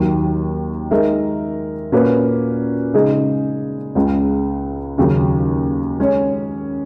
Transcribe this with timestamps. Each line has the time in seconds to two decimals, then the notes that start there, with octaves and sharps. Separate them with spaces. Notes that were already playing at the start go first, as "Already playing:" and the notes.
Already playing: D#2 D#3 F#3
0.91 G#3 D#4 A#4 E5
1.92 A#2 A#3 C#4 F#4 B4
2.94 C#3 G#3 D#4 G#4
3.95 C#2 C#3 G#3
4.98 D#2 C#3 F#3 C#4
6.00 G#3 C#4 G#4 C#5